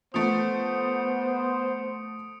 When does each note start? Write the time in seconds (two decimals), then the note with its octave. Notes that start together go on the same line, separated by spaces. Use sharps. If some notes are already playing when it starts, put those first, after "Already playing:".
0.14 F3 A3 B3 C5 D#6 C#7 D7